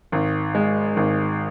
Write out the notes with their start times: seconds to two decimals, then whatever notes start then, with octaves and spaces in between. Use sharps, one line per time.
0.12 G#1
0.55 G#3
0.97 G#1